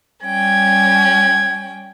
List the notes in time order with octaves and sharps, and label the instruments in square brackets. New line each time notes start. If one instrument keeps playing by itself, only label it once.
[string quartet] G3 C#4 G5 [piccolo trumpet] G#6